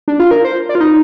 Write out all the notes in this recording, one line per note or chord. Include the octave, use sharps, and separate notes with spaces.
D4
F4
A#4
C5
D5
F4
D#4